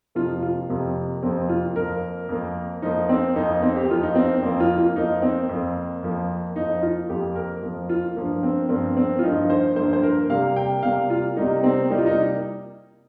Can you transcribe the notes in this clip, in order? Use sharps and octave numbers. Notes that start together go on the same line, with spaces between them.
F2 C3 F3 A#3 F4
F4
F2 C3 F3 A#3
F2 C3 F3 A#3 C4
F4
F2 F3 A#3 A#4
F2 F3 A#3
F2 F3 A#3 D#4
C4
F2 F3 A#3 D#4
C4
G4
F2 F3 A#3 F4
D#4
C4
F2 F3 A#3 C4
F4
F4
F2 F3 A#3 D#4
C4
F2 F3 A#3
F2 F3 A#3
F2 F3 A#3 D#4
F4
F2 F3 A#3 G4
A#4
F2 F3 A#3
F4
G2 F3 A#3
C4
G2 F3 A#3 C4
C4
F4
G2 F3 A#3 D#4
C5
G2 F3 A#3 C5
C5
A#4
C3 G3 A#3 F5
G5
C3 G3 A#3 F5
F4
C3 G3 A#3 D#4
C4
C3 G3 A#3 D#4
F4
D#4